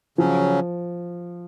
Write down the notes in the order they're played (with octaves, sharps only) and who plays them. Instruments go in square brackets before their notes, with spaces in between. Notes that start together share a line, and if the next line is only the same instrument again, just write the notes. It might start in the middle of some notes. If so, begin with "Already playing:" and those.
[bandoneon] C#3 F#3 C#4 [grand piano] F3